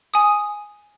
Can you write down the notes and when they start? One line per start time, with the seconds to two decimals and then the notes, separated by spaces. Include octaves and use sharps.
0.14 G#5 D#6